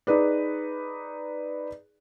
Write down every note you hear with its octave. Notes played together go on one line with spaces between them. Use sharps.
D#4 G#4 B4 D5